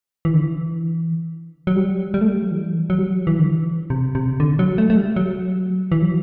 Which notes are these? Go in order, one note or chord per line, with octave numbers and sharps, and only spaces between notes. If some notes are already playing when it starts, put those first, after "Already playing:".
E3
D3
E3
F#3
G3
G3
A3
G3
F#3
E3
F#3
G3
F#3
E3
D3
E3
C3
C3
D3
F#3
A3
A3
G3
F#3
E3
F#3